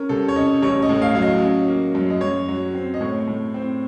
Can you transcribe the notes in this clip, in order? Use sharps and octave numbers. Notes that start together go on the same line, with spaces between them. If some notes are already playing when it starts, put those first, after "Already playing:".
Already playing: C#4 A#4
C2 A4
C#5
C#4 D#5
A1 C#5
D#5
A2
F5
F#3 F5
D#5
C#4
A#3
F#2
D#5
F#2 C#5
F#3
C4
D#5
A2 C#5
A2
C4